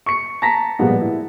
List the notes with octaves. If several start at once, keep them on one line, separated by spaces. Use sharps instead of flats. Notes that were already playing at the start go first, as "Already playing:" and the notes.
C#6 C#7
A5 A#5 A#6 B6
A#2 F3 G3 G#3 B3
E4